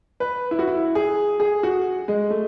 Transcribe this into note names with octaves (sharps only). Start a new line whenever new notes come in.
B4
E4
F#4
E4
G#4
G#4
F#4
G#3
A3